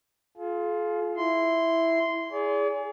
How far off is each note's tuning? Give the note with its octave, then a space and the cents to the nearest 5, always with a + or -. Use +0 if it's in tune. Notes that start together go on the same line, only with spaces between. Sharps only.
F4 +0 G#4 +45
E4 +0 C6 -10
G#4 +0 D5 -45